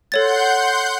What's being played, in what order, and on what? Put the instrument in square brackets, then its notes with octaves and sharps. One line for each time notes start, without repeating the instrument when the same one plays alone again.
[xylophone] A4 C#5 A6 [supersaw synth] F#5 C6 G6